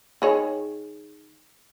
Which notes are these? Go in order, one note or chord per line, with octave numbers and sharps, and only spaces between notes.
D#3 G#4 C#5